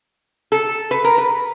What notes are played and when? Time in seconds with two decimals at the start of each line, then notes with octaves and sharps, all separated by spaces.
0.52 A4
0.91 B4
1.04 A#4
1.18 B4